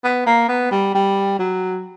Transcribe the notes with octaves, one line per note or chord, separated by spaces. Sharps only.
B3
A#3
B3
G3
G3
F#3